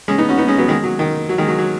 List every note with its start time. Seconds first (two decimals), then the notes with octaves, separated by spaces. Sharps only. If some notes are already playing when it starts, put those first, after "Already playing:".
0.08 G#3 C#4
0.18 B3 D#4
0.29 C#4 F#4
0.38 B3 D#4
0.48 G#3 C#4
0.58 F#3 B3
0.68 D#3 G#3
0.83 F#3
0.99 D#3
1.29 F#3
1.38 D#3 G#3
1.48 F#3
1.58 F#3